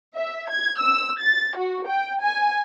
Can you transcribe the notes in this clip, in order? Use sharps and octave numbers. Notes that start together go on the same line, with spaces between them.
E5
G#6
E6
A6
F#4
G5
G#5